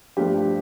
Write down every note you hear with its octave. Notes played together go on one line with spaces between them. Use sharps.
G2 F3 A3 G4